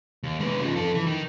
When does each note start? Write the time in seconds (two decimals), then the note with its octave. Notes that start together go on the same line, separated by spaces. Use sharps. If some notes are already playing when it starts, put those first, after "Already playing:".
0.23 D#2
0.40 G#3 B3
0.60 C#3 F3
0.75 F2 A4
0.94 E3
1.07 D#3